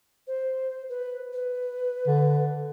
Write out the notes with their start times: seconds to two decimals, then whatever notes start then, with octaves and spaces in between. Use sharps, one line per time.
0.27 C5
0.89 B4
1.33 B4
2.08 D3